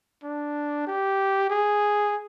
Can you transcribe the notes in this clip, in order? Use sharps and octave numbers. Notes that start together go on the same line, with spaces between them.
D4
G4
G#4